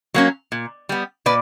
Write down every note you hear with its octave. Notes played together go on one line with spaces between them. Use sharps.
F#3 A#3 C#4
A#2
G3 B3
A#2 B4 D5